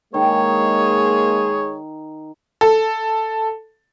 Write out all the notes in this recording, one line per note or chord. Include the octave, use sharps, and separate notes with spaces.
D#3 G#3 A#3 G#4 C#5
A4